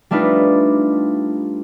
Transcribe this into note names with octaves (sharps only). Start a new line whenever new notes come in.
G3 A3 D4 D#4 F4 B4